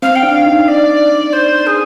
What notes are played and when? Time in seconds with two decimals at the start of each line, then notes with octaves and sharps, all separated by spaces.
0.02 C4 F5
0.15 G5
0.23 D4
0.29 F5
0.46 D#4
0.68 D5
1.33 C5
1.66 G#4